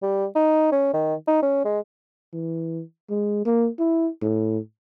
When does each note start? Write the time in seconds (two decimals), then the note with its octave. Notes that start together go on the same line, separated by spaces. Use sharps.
0.03 G3
0.35 D#4
0.72 C#4
0.94 D#3
1.27 D#4
1.43 C#4
1.65 G#3
2.34 E3
3.10 G#3
3.45 A#3
3.79 E4
4.22 A2